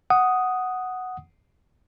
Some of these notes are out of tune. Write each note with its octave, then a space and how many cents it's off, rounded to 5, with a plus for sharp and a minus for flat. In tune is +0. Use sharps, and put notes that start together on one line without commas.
F#5 +0 D#6 +0